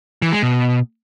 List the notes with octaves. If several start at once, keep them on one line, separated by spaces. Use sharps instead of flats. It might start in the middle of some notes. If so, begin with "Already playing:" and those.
E3
G#3
B2